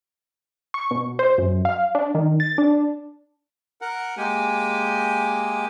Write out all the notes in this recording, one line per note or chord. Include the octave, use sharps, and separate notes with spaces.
C#6
B2
C5
F#2
F5
D4
D#3
A6
D4
A#4 F#5
G#3 A#3 G4 G#5